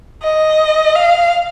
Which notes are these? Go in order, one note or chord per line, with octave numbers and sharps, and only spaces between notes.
D#5
F5